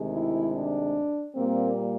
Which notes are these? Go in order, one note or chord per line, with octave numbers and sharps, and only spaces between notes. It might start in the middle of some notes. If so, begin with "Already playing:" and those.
Already playing: D2 C3 D#3 G#3
E4
D4
A#2 G3 A#3 C4